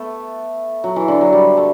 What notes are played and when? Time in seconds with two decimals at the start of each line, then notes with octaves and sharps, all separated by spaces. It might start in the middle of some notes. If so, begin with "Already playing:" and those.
Already playing: A3 B3
0.84 F#3
0.96 E3
1.08 D3
1.21 F#3
1.33 G3
1.57 A3